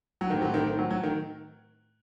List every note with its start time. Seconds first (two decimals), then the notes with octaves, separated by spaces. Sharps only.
0.21 F#3
0.30 A2 D#3 A3 C4 G4
0.42 F#3
0.54 D#3
0.67 D#3
0.79 F#3
0.90 F#3
1.03 D#3